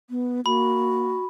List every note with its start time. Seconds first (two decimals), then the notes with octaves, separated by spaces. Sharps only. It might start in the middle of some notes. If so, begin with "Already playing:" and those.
0.10 B3
0.46 A#3 F#4 B5